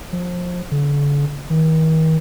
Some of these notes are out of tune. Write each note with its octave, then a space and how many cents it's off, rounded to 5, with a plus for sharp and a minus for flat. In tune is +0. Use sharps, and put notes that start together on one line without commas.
F3 +25
D3 -40
D#3 +40